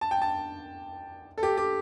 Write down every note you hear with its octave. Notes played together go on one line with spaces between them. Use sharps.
A5
G5
A5
A4
G4
G4